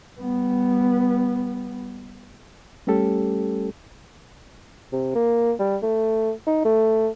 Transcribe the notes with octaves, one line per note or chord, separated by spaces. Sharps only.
G3 B3
G3 A3 C#4 G4 A4
C3
A#3
G3
A3
D#4
A3